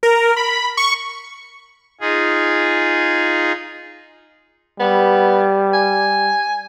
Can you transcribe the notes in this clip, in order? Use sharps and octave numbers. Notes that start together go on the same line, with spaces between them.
A#4
B5
C#6
D#4 F4 G#4
G3 B3
G#5